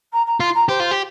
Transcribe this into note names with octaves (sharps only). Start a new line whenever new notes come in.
A#5
A#5
F4 C6
A#5
G4 C5
F4
G4